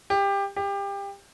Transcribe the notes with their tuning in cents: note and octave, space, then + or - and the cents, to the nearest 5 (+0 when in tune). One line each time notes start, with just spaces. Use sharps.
G4 +20
G4 +25